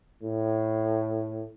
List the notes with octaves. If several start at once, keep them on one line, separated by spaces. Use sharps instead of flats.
A2